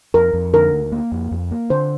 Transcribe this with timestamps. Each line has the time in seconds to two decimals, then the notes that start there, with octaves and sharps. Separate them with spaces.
0.14 F2 A#4
0.34 F2
0.53 D3 A#4
0.73 D2
0.92 A#3
1.12 F2
1.31 F2
1.51 A#3
1.70 D3 C5